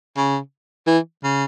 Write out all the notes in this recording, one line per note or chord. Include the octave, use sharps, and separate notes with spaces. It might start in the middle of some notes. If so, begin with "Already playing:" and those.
C#3
E3
C#3